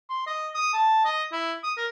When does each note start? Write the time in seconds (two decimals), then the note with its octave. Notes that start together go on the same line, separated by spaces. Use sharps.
0.09 C6
0.27 D#5
0.55 D#6
0.73 A5
1.05 D#5
1.32 E4
1.63 D#6
1.77 A#4